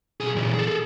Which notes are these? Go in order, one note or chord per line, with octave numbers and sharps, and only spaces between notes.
B1 G#4
A#2 E3
G#4 A4